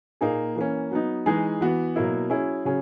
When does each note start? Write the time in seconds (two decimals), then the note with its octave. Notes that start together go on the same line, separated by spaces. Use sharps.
0.21 A#2 A#3 D#4 G#4
0.56 E3 A#3 C#4
0.91 F#3 B3 D#4
1.26 E3 G#3 D#4 G#4
1.61 E3 B3 F#4
1.96 B2 F#3 A#3 E4
2.30 F#3 C#4 E4 G#4
2.65 C#3 F#3 C#4 G#4